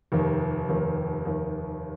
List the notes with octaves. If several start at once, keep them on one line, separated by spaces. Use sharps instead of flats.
F1 D#2 D#3
F1 D#2 D#3
F1 D#2 D#3